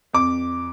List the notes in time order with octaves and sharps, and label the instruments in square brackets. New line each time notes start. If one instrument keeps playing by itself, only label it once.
[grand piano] F2 D6